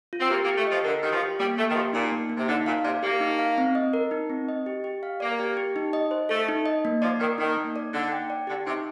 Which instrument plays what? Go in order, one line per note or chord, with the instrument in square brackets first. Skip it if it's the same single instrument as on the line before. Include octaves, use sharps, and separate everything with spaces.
[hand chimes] F4
[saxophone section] C4
[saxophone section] A#3 [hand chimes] G4
[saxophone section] A#3
[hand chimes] G4
[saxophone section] A3
[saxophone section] F3 [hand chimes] D#5
[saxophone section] D3 [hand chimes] A#4
[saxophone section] D#3 [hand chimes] G4
[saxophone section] F3
[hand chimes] G4
[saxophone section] G3 [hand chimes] A#3
[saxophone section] A3 [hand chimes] A#3
[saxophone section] D#3
[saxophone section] F3 [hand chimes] G4
[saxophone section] A#2 [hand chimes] D#4
[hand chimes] A#3
A#3
[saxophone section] C3
[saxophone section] D3 [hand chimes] D#4
[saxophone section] A#2 [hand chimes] F5
[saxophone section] C3 [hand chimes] D5
[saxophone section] A#3 [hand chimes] G4
[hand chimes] D#4
F5
C4
D#5
A#4
D#4
C4
D#5
G4
G4
F5
[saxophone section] A#3 [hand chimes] D5
[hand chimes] G4
G4
D#4
D#5
C5
[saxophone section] A3 [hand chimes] A4
[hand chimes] D#4
D#5
A#3
[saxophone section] F3 [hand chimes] D5
[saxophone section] D#3 [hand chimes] A#4
[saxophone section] D#3 [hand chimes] D#4
[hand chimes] A#3
D5
[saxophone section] D3 [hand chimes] D#4
[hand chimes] G5
D5
[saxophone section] D3 [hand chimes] G4
[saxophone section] C3 [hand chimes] D#4